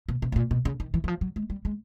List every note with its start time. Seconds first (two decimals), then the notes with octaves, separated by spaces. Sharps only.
0.09 B2
0.22 C3
0.32 A2
0.36 A#2
0.51 B2
0.65 C#3
0.80 D#3
0.94 E3
1.04 E3
1.08 F3
1.21 F#3
1.36 G#3
1.50 G3
1.65 G#3